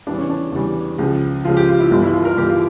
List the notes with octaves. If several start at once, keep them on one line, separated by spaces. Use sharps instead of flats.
E2 E3 G3 D4
C#4
D4
E2 E3 G3
C#2 C#3 F3
C#2 C#3 F3 F4
G4
F4
E4
G1 G2 E3
E4
F4
A#4
G1 G2 E3 G4
F4